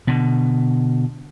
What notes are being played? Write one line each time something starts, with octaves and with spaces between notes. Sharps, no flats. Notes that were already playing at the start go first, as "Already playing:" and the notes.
B2 D3